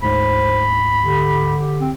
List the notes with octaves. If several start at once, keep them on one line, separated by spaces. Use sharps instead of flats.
D2 G#2 C5 B5
D3 G4
C4